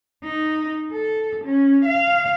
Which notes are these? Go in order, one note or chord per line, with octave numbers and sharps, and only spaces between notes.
D#4
A4
C#4
F5